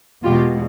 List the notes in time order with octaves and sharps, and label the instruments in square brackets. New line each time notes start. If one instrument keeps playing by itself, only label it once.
[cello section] E2 B2 G#3 F4 G4